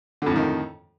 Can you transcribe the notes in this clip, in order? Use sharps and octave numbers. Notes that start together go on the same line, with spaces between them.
F2 A2 D3 D#3